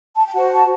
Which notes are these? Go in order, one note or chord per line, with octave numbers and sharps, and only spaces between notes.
A5
G5
F#4 C5 F#5
A5